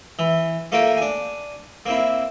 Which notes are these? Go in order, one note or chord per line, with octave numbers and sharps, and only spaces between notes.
E3
A3 A#3 F4 A#4 G5
D4 G#5
A#3 C4 E4